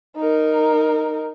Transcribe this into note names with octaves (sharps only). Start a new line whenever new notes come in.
D#4 A#4